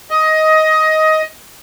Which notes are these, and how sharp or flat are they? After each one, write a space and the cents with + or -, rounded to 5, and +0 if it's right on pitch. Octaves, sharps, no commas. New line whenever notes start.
D#5 +15